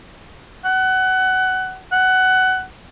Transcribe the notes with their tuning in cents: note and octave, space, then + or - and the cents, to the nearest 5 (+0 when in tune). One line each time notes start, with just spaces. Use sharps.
F#5 +20
F#5 +15